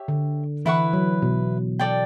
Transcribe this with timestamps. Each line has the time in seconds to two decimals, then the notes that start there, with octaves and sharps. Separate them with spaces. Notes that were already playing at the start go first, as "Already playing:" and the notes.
Already playing: G4 C#5 E5
0.08 D3
0.65 E3 E4 B4 F#5 C#6
0.93 F#3
1.22 B2
1.79 A4 D5 G5